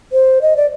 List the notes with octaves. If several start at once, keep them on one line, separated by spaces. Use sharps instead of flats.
C5
D#5
D5